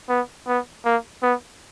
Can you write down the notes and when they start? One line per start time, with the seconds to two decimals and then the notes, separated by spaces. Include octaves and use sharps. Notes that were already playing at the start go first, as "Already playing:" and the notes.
0.09 B3
0.47 B3
0.85 A#3
1.22 B3